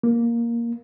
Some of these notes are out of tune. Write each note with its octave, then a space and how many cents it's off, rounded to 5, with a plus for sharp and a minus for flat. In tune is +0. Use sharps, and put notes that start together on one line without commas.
A#3 +5